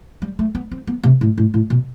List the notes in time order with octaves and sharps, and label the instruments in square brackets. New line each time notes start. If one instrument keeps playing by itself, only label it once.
[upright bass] G3
A3
B3
C4
B3
C3
A2
A2
A2
B2